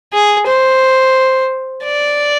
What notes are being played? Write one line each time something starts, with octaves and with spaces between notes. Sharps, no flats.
G#4
C5
D5